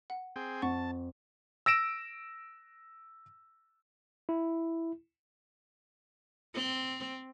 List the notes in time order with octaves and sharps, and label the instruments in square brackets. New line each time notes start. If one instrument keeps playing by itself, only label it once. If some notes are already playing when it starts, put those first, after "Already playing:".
[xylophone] F#5
[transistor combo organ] C4 G#4 G5
[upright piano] F2 [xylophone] F#5 C#6 [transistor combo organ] A5
[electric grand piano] E6 A#6 D7 E7
[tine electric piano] E4
[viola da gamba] C4